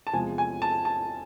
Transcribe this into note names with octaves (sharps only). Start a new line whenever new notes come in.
A5
E2 C3 F3 G#3 G#5
G#5
A5
A5